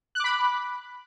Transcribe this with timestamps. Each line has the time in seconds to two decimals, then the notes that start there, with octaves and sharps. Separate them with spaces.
0.15 F#6
0.20 D6
0.24 B5